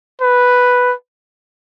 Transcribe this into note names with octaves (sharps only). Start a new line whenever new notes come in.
B4